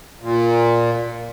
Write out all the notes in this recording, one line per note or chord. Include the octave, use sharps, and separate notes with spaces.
A#2